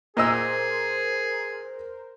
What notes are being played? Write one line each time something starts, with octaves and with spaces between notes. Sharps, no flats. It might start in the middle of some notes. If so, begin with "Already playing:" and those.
A#2 G#4 A#4 C5 D#5 E6